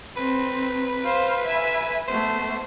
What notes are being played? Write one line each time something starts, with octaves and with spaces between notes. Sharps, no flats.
C4 B4
C5 F5
E5 G#5
A3 B3 C5